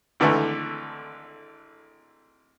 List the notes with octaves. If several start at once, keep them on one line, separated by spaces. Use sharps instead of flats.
G#1 D3 E3 A3